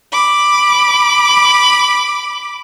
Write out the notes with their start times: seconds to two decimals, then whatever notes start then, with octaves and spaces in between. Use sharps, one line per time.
0.12 B5 D6